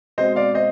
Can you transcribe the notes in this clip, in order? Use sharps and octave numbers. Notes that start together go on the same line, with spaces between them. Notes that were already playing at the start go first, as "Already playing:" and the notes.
B2 G#3 C4 C5 D#5
D5 F5
C5 D#5